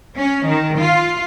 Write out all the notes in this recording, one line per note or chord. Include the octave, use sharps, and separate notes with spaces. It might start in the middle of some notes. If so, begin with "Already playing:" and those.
C#4
D#3
F4